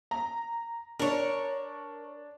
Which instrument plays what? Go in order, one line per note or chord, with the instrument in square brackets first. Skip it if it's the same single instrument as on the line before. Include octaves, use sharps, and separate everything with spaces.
[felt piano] A#5
[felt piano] D4 [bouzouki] A#4 C#5